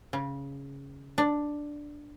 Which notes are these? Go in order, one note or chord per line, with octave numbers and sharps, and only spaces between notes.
C#3
D4